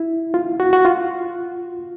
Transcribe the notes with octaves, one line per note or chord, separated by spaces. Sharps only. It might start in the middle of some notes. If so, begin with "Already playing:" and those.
Already playing: E4
F4
F#4
F#4
F4